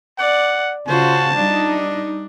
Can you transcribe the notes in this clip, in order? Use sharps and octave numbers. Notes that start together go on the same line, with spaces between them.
D5 F#5
C#3 F4 F#4 C5 A5
G3 D4 D#4